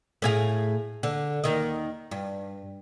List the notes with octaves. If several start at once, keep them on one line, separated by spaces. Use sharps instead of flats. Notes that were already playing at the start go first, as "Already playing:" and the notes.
A2 G#4 F5
D3
D#2 D#3 D#5
G2